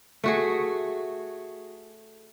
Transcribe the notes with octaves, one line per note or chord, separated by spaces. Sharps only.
A3 F#4 G#4